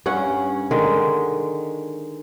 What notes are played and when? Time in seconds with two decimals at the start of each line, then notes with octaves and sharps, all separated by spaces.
0.06 G2 C#4 F#5
0.71 D3 D#3 G#3